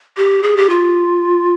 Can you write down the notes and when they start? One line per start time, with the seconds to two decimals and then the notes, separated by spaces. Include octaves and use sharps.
0.17 G4
0.43 G#4
0.57 G4
0.70 F4